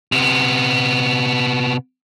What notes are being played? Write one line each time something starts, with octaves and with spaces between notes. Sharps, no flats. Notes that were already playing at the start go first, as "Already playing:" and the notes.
C3 B3